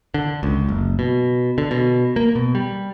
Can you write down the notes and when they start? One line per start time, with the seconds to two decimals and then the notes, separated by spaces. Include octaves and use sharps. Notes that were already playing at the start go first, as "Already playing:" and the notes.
0.14 D3
0.43 C#2
0.69 F#1
0.99 B2
1.58 D3
1.71 B2
2.16 A#3
2.35 B2
2.55 G3